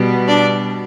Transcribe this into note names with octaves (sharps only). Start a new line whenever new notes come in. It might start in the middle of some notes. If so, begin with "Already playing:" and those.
Already playing: B2 G3 B3
D4 D5